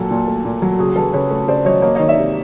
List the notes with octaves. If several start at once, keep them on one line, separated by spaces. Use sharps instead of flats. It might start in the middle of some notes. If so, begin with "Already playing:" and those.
Already playing: A#2 F#3 A4
A#2
A3
A#2
F#3
C#3 F#4 G#4
F#3 A4 B4
C#3 B4 C#5
A3
C#3 C5 D5
F#3 C#5 D#5
A#3 C#5 D#5
D#3 C#5 D#5
D5 E5
C3